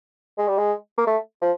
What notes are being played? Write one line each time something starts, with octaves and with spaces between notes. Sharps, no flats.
G#3
G3
G#3
A#3
A3
F3